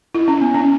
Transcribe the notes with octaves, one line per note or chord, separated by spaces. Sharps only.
E4
C#4
B3
C#4